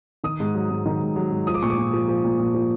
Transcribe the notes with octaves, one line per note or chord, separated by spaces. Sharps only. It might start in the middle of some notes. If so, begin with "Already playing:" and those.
D#3 D#6
G#2
F#3
G#2
D#3
G#2
F#3
G#2
F3 D#6
D6
A#2 C#6
D6
A#2
F3
F3
A#2
A#2
F3